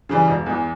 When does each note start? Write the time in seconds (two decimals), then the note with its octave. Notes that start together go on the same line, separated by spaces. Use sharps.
0.09 C#3 E3 G3
0.28 E1
0.46 E2 E3